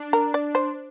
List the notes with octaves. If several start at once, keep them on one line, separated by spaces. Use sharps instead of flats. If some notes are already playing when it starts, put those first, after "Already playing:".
Already playing: D4
A#4
D5
C5